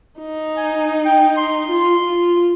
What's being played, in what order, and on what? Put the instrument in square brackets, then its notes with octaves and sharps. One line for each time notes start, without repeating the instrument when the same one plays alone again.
[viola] D#4
[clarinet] G#5
G5
C6
[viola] F4
F4